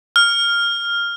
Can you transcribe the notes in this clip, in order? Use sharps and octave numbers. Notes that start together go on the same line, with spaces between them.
F6